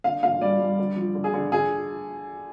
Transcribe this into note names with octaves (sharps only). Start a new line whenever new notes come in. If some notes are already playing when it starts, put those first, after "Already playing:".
D3 F5
D3 F5
G3 D5
G3
D3
F3
D3
G#4
D3
D3 G#4